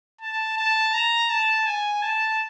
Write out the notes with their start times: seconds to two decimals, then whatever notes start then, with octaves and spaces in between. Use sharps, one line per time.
0.21 A5
0.58 A5
0.94 A#5
1.30 A5
1.66 G#5
2.03 A5